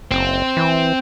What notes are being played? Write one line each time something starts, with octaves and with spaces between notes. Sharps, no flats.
F#1 C4
E3